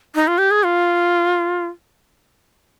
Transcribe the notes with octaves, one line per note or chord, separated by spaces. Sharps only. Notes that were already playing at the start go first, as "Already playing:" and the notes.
D#4
F4
G4
G#4
F4